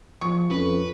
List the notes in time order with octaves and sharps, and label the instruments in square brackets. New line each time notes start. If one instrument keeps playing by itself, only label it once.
[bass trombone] F3 [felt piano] C#6
[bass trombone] F2 [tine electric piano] C#4 A4 [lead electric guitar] B4